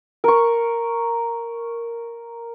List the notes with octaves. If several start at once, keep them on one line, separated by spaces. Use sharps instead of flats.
A#4 C#6